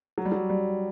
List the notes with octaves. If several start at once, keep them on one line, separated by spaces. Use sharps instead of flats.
F#3
G3
F#3
G3